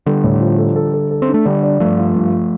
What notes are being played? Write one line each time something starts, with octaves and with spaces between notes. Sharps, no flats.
D3 G3 A4
A2
F3
A4
A4
A4
A4
C4
D4
A3
D3 G3 D5
D5
G2 F3 A3
F4
G2